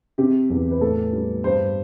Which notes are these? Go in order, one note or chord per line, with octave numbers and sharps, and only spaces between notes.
C3 G4
E2
B4
A2 A4
G3
G2 C5